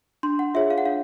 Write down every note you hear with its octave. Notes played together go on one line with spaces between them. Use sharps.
D4 C6
F#5
F4 G#4 C#5 E5
F5
F#5
D4 F5